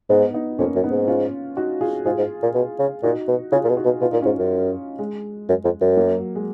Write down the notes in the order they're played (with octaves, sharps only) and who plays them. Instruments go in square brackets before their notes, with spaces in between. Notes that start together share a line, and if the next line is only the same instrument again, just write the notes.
[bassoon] G#2 [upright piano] B3 D#4
[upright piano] B3 D#4
[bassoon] F2 [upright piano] A#3 C#4
[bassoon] F#2
[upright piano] B3 D#4
[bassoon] G#2
[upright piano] C#4 F4
D#4 F#4
F4 G#4
[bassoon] G#2 [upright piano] F4 G#4
[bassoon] G#2
A#2
B2
C#3
[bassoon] A#2 [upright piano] D#4 F#4
[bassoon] B2
[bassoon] C#3 [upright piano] F4 G#4
[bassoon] A#2
B2
[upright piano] D#4 F#4
[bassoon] B2
[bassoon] B2 [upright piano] F4
[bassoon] A#2 [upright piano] D#4
[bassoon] G#2 [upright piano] C#4 F4
[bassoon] F#2
[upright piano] G#3
[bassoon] F#2
F2
F#2
[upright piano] F#3 A#3
G#3